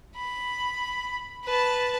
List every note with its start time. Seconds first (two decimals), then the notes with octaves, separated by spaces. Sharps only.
0.16 B5
1.44 B4 A5